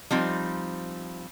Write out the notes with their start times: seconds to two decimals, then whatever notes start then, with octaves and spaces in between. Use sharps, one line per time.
0.11 F3 G3 C4 D#4